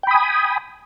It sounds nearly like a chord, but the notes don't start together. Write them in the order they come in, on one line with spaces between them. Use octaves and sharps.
G5 B5 D#6 G#5